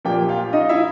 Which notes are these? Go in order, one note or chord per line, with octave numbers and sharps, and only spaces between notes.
A#2 F3 A#3 G4 G5
F4 F5
D#4 D#5
E4 E5